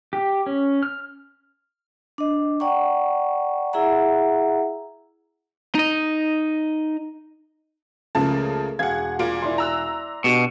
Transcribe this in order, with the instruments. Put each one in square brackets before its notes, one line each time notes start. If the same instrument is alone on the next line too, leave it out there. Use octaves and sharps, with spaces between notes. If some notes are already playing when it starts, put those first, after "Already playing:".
[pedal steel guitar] G4
C#4
F6
[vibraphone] D4 D#5
D5 F#5 G5 A#5 C#6
E4 G#4 E5 F#5 A#5
[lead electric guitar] D#4 D#5
[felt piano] C#2 [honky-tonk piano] C#3 F3 A5 [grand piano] A3 A#3
[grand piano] E1 G#4 [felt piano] F5 [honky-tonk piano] F#5 G#6
[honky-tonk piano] A#2 F4 D7
[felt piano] E4 D5 C6
[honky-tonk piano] A#5 E6 F#6
[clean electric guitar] B2 [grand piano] D4 G4